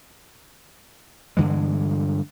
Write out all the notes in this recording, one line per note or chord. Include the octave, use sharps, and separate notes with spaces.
G2 D3 E3 G#3